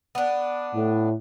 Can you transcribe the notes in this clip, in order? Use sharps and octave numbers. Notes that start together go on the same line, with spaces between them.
B3 D4
A2